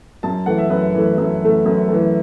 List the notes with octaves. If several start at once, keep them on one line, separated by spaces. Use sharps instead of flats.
F#2 A5
E3 A3 F#5
E5
F#2 B4
E3 A3
F#2
E3 A3
F#2
E3 A3